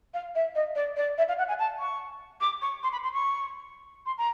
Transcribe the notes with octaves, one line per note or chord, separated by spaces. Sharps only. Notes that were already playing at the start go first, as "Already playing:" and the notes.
F5
E5
D#5
D5
D5
E5
F5
F#5
G#5
A5
C#6
D6
C#6
C6
B5
C6
C#6
C6
A#5